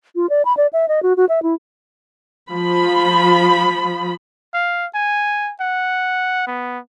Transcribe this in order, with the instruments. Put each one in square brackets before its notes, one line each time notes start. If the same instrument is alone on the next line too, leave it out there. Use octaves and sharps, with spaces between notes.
[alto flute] F4
D5
B5
D5
E5
D#5
F#4
F#4
E5
E4
[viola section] F3 B5
[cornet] F5
G#5
F#5
B3